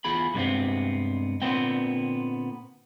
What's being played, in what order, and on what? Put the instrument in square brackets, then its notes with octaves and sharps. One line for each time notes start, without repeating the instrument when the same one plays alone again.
[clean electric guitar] E2 F4 G#4 B5
G2 C3 G#3 A3 B3 C4
A#2 D3 B3 C4 G5